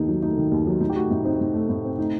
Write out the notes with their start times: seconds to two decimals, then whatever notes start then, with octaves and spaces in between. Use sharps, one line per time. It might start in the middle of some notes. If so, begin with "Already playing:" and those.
Already playing: D#2 D#3 A3 D#4
0.09 F#3
0.22 A3 D#4
0.37 D#3
0.52 D#2
0.67 F#3
0.80 A2 D#4
0.90 G4
0.95 A3 F#4
1.10 A2 D#4
1.25 C4 D#4
1.40 A2
1.54 A3
1.69 A2
1.84 C4
1.98 A3 D#4